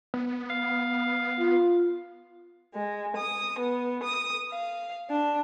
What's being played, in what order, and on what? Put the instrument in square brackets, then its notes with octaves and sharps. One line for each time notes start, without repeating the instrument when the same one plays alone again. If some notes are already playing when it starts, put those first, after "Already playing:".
[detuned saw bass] B3
[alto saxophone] F5
[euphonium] F4
[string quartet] G#3
D#6
B3
D#6
F5
D4